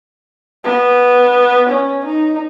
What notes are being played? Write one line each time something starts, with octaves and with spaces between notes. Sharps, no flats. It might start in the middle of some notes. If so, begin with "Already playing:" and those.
B3
C#4
D#4